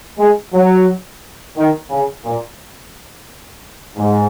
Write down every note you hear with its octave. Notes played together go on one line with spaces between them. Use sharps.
G#3
F#3
D#3
C#3
A#2
G#2